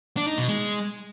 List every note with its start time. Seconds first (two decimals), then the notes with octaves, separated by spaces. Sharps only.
0.17 D4
0.27 D#4
0.38 B2
0.48 G#3